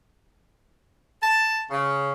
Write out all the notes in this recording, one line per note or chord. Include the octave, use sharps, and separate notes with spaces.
A5
C#3